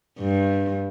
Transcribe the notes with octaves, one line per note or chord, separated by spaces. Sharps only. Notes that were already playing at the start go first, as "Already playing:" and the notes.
G2